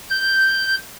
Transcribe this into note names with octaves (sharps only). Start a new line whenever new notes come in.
G6